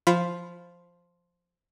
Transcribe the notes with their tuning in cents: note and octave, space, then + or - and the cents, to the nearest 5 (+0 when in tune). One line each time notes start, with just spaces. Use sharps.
F3 +0 F4 +0 B5 +10